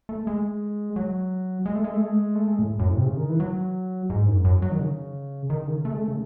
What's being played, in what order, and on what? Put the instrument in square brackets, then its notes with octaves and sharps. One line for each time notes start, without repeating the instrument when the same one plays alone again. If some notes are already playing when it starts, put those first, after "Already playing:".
[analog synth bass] A3
G#3
F#3
G#3
A3
G#3
A3
G#3
A3
G#3
A2
F#2
A2
C3
C#3
D#3
E3
F#3
G#2
F#2
F#2
F#3
D#3
C#3
D#3
C#3
A3
G#3
A3
C#3